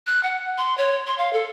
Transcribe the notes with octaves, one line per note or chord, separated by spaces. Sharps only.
F#6
F#5
C6
C#5
C6
F5
A4